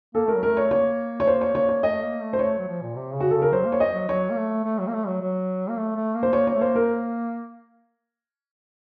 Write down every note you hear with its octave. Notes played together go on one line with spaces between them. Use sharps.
A#3 A4
A3 A#4
F#3
A3 A#4
C#5
A#3 C#5
A3 C#5
A#3 C5
C#5
A#3 C#5
C#5
A3 D#5
A#3
A3
C5
A3 C#5
F#3
F3
A#2
C3
C#3
F#4
C#3 A4
A#4
F#3 C5
A#3
C#5
D#5
F#3
F#3 C#5
A#3
A3
A3
F#3
A#3
A3
F#3
F#3
A#3
A3
A3
A#3
C5
A#3 C#5
C#5
A3
A#3 C5
A#4